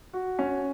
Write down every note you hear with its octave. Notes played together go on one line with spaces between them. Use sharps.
F#4
C#4